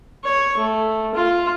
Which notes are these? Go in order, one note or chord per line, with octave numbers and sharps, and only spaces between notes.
C#5
A3
F4